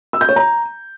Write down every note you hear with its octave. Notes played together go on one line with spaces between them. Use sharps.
E6
G6
C#5
A#5